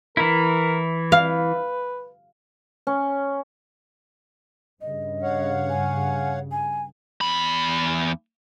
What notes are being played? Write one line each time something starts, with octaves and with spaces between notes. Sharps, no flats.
E3 E4 A#4
B4 F5
C#4
G2 C#3 D#5
C#5 F5 F#5
G#5
G#5
E2 B5